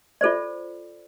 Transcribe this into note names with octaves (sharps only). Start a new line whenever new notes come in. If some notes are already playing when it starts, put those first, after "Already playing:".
F4 A4 C5 D5